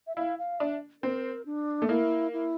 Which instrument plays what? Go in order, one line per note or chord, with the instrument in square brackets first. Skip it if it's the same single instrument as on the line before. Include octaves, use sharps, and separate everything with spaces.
[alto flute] E5
[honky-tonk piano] E4 [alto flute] F5
[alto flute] F5
[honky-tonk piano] D4 [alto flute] E5
[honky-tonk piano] C4 [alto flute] A#4
[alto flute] D4
[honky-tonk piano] A3
[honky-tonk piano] A#3 [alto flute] E4
[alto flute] E4